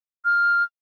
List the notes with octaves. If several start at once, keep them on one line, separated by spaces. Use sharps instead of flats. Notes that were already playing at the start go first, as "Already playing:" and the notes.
F6